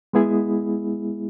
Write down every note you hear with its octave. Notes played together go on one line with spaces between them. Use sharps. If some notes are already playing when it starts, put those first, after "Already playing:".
G#3 B3 E4 G#4